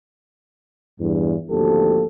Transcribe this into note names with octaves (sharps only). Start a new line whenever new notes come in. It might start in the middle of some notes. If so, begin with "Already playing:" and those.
E2 G2
G#1 D2 F3 A#3 G4 A4